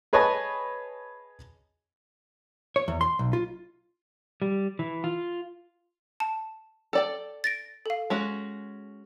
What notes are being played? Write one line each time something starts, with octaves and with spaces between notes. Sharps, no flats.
G#4 B4 C#5 D#5 G#5 A5
C#5
E2
C6
B1
F4
G3
E3
F4
A5
A4 D5 G5
A6 A#6 D7
A4 F5
G#3 C#4 F#4